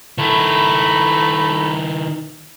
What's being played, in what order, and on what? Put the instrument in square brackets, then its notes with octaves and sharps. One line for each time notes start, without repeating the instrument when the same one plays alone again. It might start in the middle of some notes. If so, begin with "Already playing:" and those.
[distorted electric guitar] D#3 E4 [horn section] A3 A#5 B5